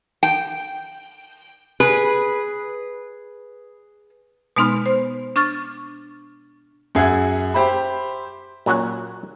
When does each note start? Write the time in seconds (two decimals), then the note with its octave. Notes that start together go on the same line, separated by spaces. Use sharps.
0.23 G5
1.80 G#4 B4
4.56 B2 G#3 B3 D#4 C6 F6
4.86 C5
5.36 D4 C#6 F6 A6
6.95 F#2 G#4 E5 F#5 G#6
7.54 G4 C5 E5 B5
8.66 A#2 F#3 C#4 F#4 F#5